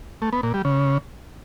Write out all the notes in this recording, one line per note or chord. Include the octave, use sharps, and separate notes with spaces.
A3
B3
A#2
G3
C#3